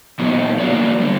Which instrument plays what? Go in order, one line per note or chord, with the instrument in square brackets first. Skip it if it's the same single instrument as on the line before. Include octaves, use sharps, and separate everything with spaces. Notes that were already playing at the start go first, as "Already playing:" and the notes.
[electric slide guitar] A#2 F#3 B3 D#4 G4
A#3 D4 F#4 B4 D5
D3 G3